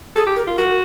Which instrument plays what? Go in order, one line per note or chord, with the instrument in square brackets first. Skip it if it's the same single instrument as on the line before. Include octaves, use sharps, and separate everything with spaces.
[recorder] G#4 [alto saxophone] A4
[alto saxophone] G4
[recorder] A#4
[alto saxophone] F4
[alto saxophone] F#4 [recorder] A#4